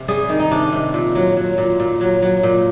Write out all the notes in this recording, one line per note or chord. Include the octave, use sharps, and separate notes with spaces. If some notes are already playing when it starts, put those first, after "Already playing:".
Already playing: C3
G3 G#4
D#3
D#4
C3 D4
C3
A#2
F#3
F#3
A#2
A#2
F#3
F#3
A#2